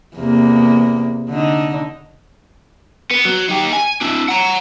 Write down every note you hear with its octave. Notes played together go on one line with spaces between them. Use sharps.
E2 C3 A#3
D3 D#4
B3
F#3
D#4 G4
G#5
D4 E4
F#5 A#5